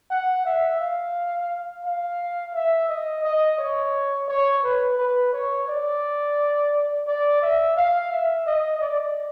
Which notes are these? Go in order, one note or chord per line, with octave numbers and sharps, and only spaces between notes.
F#5
E5
F5
F5
E5
D#5
D#5
C#5
C#5
B4
B4
C#5
D5
D5
E5
F5
E5
D#5
D5